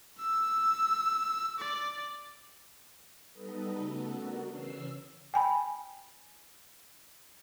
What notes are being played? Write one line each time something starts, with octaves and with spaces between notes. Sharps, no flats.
E6
D5
G3 B3 D#4 A4 B4 D#5
C#3 A3 B3 F#4 A4
D4 F#4 A#4
C#3 E3 C#4 E6 C7
G5 G#5 B5